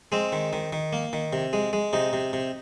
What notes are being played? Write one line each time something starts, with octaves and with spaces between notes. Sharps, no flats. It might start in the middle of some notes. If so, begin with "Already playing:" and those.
G#3 C4
D#3
D#3
D#3
A#3
D#3
C3
G#3
G#3
C3 D#4
C3
C3